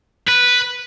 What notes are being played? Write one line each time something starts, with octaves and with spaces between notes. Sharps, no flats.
B4